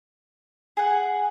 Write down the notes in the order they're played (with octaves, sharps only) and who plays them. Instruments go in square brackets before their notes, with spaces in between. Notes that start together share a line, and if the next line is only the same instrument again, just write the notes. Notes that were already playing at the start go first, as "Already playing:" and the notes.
[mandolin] G#4 F#5